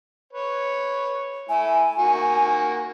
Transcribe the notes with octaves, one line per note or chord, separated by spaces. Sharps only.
B4 C#5
A3 E4 G#5
D#3 A#3 F#4